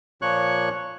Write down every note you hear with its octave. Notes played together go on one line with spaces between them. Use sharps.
A#2 F3 A#3 C#5 C#6 F#6